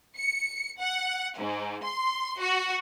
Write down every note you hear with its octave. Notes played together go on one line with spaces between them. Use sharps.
C#7
F#5
G#2
C6
F#4